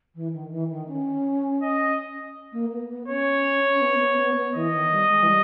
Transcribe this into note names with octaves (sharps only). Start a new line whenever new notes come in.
E3
D#3
E3
D#3
C#4
D#5
A#3
B3
B3
C#4 C#5
C#4
B3
B3
B3
B3
E3 D#5
D#3
G3
G#3
E3
G3